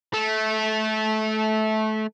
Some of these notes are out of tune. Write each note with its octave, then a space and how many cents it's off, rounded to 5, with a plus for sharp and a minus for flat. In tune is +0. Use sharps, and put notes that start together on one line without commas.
A3 -20